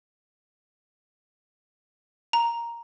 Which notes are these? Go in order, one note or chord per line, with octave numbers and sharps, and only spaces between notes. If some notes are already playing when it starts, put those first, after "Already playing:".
A#5